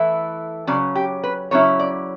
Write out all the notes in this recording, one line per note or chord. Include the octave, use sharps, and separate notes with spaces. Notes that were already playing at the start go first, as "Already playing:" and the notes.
Already playing: E3 A3 E4
C#3 F#3 C#4 D5
G4
B4
C#3 F#3 C#4 E4 C#5
D5